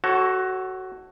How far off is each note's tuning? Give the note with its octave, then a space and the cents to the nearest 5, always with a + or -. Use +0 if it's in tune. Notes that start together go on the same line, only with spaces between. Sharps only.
F#4 +15 A4 +0 C#5 -30